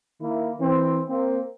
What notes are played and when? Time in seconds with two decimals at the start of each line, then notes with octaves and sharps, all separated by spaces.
0.21 D#3 A#3 E4
0.60 E3 C4
1.08 A#3 C4